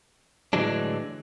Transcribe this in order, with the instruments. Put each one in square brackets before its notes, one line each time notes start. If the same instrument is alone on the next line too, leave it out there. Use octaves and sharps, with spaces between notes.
[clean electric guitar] A2 D3 E3 F#3 G#3 D4